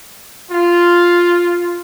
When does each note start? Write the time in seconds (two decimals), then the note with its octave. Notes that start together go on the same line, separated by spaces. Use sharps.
0.51 F4